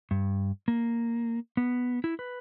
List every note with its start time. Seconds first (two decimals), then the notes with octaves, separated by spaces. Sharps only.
0.11 G2
0.68 A#3
1.57 B3
2.04 E4
2.19 B4